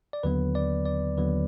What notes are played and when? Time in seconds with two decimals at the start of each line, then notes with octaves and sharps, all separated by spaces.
0.13 D5
0.23 D#2 D3 F#3 B3 B4
0.55 D5
0.86 D5
1.17 D#2 D3 F#3 B3 B4